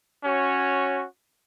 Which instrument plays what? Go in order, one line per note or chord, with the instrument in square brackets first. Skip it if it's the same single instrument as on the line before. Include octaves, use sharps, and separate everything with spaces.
[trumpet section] C#4 F#4 C#5